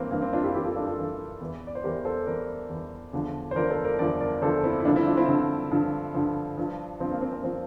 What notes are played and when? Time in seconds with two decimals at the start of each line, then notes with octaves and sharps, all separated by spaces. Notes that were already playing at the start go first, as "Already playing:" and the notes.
Already playing: G2 E3 A#3 C4
0.11 G2 E3 A#3
0.22 C4
0.33 D4 F4
0.44 E4 G4
0.54 G2 E3 E4 G4
0.65 F4 A4
0.76 D4 F4
0.87 F4 A4
0.98 G2 E3
1.40 E2 E3
1.67 D5
1.75 C5
1.83 E2 E3 G4 A#4
2.05 A4 C5
2.26 E2 E3 A#4 D5
2.69 E2 E3
3.13 E2 D3 F3
3.51 C5
3.56 E2 D3 F3 A#4 D5
3.70 A4 C5
3.84 A#4 D5
3.99 E2 D3 F3 A#4 D5
4.20 A#4 D5
4.42 E2 D3 F3 A4 C5
4.64 C4 E4
4.80 E4
4.85 G2 D3 F3 A#3 D4
4.96 C4 E4
5.06 D4 F4
5.17 C4 E4
5.28 G2 D3 F3
5.71 G2 D3 F3
6.14 G2 D3 F3
6.57 G2 F3
7.00 G2 F3 C4
7.11 A#3
7.22 C4
7.33 C4
7.44 F3 C4